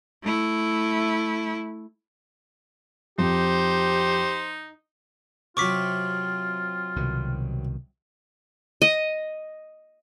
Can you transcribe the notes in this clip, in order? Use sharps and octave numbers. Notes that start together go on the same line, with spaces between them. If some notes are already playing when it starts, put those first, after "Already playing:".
A3 E4
F2 D#4 G4 C5
C3 F#3 F4 C#6 D6 B6
C2 B2 D#3
D#5